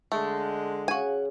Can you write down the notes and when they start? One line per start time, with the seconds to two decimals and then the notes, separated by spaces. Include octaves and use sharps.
0.12 D3 G#3 A3
0.88 C#3 F#4 G#5